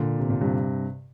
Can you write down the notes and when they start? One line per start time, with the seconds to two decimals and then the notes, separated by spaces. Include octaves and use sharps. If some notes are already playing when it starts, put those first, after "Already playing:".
Already playing: A#2 D3
0.18 C3
0.30 A#2
0.41 G2 C3